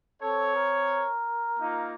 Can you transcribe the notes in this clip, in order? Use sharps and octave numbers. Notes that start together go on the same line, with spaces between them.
C4 A4 C#5
A#4
A#3 D#4 F4